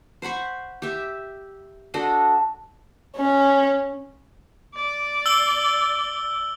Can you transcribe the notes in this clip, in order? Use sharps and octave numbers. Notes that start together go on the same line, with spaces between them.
C5 F#5 B5 C#6
G4 E5
D4 F#4 A4 D#5
C#4
D5
E6 F#7 G7